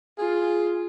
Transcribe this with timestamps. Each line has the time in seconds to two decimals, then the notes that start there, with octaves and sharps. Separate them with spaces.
0.18 F4 G#4